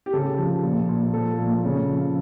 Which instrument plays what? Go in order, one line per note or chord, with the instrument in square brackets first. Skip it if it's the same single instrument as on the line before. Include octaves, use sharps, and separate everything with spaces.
[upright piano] G4
C#3 A4
F3
A#2
A#2
F3 A4
A#2
C#3
F3